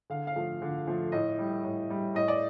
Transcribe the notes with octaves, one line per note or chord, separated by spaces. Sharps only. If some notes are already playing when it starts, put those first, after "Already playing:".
D3 F5
F5
F3 A3
D3
F3 A3
A2 D#5
G3
A2
G3
A2 D#5
D5